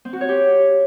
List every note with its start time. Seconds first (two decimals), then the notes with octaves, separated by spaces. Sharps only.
0.05 C4
0.13 F#4
0.21 C#5
0.29 G4